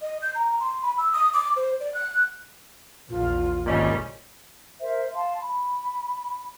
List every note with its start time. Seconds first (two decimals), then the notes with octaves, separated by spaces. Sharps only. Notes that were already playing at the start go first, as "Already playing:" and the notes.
0.01 D#5
0.22 G6
0.35 A#5
0.60 C6
0.82 B5
0.98 E6
1.13 D#6
1.33 D6
1.56 C5
1.80 D5
1.94 F#6
3.10 A#1 E2 F4
3.66 G#1 A#2 G3 C#4 D#5
4.81 A#4 C5 E5
5.14 F5 A5 C6
5.42 B5